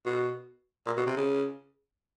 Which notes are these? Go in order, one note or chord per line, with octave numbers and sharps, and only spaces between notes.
B2
A#2
B2
C3
C#3